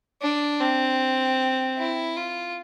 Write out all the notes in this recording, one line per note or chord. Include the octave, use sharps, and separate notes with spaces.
D4
C4
E4
F4